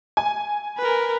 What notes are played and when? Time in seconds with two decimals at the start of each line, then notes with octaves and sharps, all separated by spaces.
0.17 G#5
0.78 A#4 B4